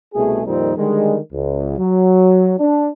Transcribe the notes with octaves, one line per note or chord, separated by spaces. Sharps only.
C2 B2 A3 G#4
F2 A#2 D#3 G3 C4 D#4
D3 D#3 G3 G#3
C#2
F#3
D4